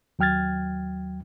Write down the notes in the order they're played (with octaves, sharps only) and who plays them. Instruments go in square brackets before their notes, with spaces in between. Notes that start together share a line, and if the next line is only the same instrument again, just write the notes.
[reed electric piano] D#2 F#3 G5 F6 G#6 A6